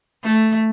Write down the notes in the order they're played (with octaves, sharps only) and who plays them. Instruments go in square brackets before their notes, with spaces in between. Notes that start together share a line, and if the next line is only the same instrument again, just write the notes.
[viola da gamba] A3